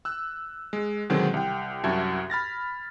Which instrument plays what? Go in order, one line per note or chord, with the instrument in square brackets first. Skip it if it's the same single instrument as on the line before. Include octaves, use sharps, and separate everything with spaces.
[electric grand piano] E6 F#6
G#3
B2 D3 D#3 F#3 G#3 C4
C2 G5
C2 F#2 F#4 E5 A5 G#6
B5 F6 A6 A#6